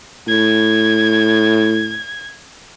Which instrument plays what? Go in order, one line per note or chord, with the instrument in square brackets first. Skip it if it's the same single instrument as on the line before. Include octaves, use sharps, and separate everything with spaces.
[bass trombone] A2 [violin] G#6